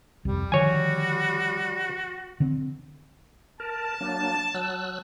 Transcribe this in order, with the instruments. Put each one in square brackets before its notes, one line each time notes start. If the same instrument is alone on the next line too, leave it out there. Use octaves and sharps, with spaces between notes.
[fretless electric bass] C2 F2 [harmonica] G3
[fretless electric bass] D3 D#3 F3 [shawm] F#4 [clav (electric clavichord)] C#5 G#5
[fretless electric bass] D3 C4
[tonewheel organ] A#4 [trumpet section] A5
[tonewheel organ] F#3 A#3 D4
F#3 E6 F#6